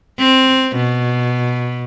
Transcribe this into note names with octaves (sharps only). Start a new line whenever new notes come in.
C4
B2